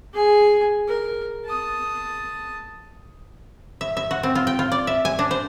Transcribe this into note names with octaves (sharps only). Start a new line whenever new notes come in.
G#4 G#5
A#4
A5 D#6
E5
E5
F#4
C4
F4
G5
F4
D5
E5
G#5
D4
C5